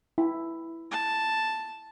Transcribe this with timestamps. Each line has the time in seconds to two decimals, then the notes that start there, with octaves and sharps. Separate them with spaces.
0.18 E4
0.92 A5